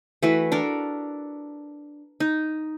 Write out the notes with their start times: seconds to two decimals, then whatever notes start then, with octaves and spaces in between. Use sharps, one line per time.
0.23 E3 A3 F#4 B4
0.52 D4 A4 A#4
2.20 D#4